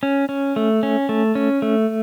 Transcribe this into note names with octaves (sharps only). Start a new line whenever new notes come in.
C#4
C#4
A3
C#4
A3
C#4
A3